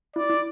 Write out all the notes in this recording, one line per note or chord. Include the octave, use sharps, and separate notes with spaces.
E4 D5
E4